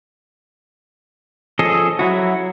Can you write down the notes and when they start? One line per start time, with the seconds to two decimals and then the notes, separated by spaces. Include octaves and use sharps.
1.59 F3 C#4 G#4 A4 D#5
1.99 F#3 E4 F#4